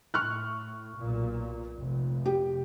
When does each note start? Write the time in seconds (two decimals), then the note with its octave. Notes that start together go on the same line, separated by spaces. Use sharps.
0.14 A2 C#6 F6 F#6
0.97 B1 A#2
1.77 F1
2.26 G4